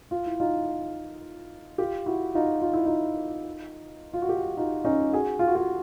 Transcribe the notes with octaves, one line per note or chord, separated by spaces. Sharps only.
F4
E4
D#4 F4
F4 G4
E4 F#4
D#4 F4
F4
E4
D#4 F4
F4
F#4
F4 G4
D#4 F4
C#4 D#4
F#4 G#4
F4
F#4
F4 G4